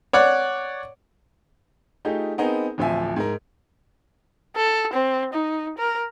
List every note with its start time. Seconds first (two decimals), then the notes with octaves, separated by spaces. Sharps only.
0.13 C#5 D5 F#5
2.05 A3 D#4 F4 G4 G#4
2.38 B3 C4 D#4 G#4 A#4
2.78 D1 A1 F3 F4 E5 G#5
3.16 G#2 A#4
4.56 A4
4.93 C4
5.33 D#4
5.78 A#4